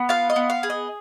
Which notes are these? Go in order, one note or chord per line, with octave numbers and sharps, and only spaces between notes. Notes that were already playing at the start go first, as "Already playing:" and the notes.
Already playing: B3
F4 F5
D#5
B3
F5
G#4
D#5